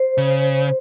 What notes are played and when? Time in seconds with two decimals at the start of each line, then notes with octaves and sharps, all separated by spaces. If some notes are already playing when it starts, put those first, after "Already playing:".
Already playing: C5
0.18 C#3